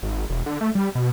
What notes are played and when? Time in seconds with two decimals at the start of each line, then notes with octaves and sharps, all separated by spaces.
0.03 G#1
0.30 E1
0.46 D3
0.61 A3
0.75 G3
0.95 B2